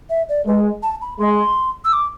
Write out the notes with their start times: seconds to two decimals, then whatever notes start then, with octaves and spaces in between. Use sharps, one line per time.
0.10 E5
0.29 D5
0.46 G#3 B4
0.83 A5
1.02 B5
1.19 G#3 C6
1.85 E6
1.93 D6